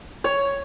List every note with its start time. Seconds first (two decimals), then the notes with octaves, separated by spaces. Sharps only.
0.24 C#5